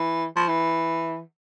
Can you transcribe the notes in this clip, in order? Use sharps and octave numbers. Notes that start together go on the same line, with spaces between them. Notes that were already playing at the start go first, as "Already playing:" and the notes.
Already playing: E3
F3
E3